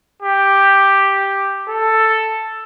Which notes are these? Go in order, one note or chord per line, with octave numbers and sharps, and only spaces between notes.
G4
A4